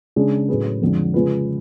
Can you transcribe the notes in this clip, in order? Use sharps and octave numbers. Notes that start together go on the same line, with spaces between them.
C#3 G#3 D4 G#4
A2 F#3 C#4 G#4 B4
F2 D3 F3 G#3
C#3 G#3 C#4 F4 B4